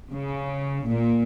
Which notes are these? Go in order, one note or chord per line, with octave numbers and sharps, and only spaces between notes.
C#3
A#2